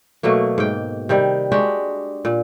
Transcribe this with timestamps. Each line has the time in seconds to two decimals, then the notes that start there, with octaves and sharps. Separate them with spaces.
0.23 B2 F#3 A3 A#3
0.58 G#2 G5
1.09 C3 D#3 G3
1.52 G#3 D4 F#4 G4
2.25 A#2